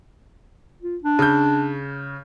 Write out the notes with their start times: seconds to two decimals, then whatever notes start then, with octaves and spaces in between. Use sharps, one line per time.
0.82 F4
1.04 D4
1.19 C#3 G6